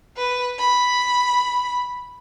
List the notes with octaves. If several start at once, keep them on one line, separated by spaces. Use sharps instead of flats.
B4
B5